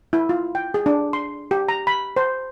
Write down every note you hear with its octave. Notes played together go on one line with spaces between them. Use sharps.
E4
F4
G5
G#4
D4
C6
G4
A#5
B5
C5